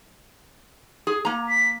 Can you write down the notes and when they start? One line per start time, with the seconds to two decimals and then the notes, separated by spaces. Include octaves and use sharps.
1.07 G#4
1.25 A#3 A#5
1.49 B6